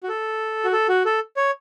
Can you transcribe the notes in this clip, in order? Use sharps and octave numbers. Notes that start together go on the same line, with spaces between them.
F#4
A4
F#4
A4
F#4
A4
C#5